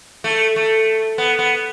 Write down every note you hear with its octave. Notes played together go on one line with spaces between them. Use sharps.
A3
A3
B3
B3